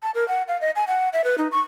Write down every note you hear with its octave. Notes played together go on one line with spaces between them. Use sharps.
A5
A#4
F#5
F5
D#5
G#5
F#5
E5
B4
D#4
C#6